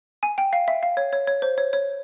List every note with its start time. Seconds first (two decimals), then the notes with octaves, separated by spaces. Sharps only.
0.23 G#5
0.38 G5
0.53 F5
0.68 E5
0.83 F5
0.97 C#5
1.13 C#5
1.27 C#5
1.42 C5
1.58 C#5
1.73 C#5